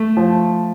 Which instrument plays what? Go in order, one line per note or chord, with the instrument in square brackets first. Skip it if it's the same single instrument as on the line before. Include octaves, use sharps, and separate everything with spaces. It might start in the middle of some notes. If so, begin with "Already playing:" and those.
Already playing: [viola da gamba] A3
[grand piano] F3